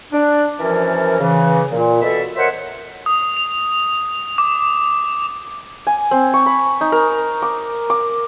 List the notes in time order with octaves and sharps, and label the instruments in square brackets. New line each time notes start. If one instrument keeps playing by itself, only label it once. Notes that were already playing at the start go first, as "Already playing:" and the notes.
[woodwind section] D4
F#2 E3 F3 C#4 A#4 A5
C#3 E3
A#2
B2 A4 E5
A#4 C5 C#5 D#5 E5 F#5
[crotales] D#6
F7
D6
[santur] G#5
C4
C#6
B5
D#4
A#4
D6
D6